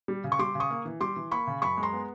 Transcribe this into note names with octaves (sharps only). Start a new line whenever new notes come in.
G3
C#3
C#6
G3 C6 D6
C#3
C#6 D#6
A#3
E3
G3 C6 D6
E3
A#3 B5 C#6
C#3
F#2 B5 C#6
G#3
A#5 C6
B3